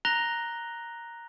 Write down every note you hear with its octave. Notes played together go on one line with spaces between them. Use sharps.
A#5 F#6 A#6 F7 G7